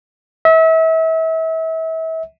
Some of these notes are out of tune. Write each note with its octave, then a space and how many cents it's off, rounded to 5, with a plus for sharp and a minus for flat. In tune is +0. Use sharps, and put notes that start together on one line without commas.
E5 -35